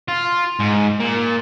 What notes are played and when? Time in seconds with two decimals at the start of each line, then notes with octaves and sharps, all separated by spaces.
0.08 F4
0.60 G#2
1.00 A#2